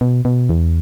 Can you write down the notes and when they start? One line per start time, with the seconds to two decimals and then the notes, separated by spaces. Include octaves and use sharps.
0.01 B2
0.25 B2
0.49 E2